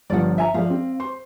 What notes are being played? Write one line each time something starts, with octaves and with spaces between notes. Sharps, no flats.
G1 G2 F3 D5 F#5
E5 G#5 A#5
F3 G#3 D5 F5
C4
C5 C6